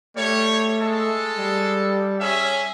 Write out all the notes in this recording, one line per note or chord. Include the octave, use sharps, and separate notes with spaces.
G3 A3 C#5
G#3 A4
G3
C#4 G#4 E5